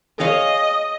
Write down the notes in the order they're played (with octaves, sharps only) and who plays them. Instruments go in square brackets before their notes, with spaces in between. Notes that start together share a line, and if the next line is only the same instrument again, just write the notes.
[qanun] G#4 C#5 F5 [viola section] D#5